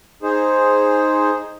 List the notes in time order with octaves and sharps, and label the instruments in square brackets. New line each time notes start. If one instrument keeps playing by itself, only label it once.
[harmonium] D#4 G#4 C5